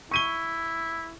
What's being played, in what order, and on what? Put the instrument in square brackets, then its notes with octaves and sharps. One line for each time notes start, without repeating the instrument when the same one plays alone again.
[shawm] E4 [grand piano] C#6 D#7 G7